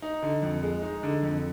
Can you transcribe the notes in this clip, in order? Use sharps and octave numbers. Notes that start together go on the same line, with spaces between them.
D#4
D3
F2
G#3
D#4
D3
F2